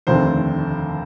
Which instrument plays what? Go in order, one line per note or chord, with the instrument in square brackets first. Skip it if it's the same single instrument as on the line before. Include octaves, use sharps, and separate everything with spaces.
[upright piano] F1 D#2 D3 A3 C4 C5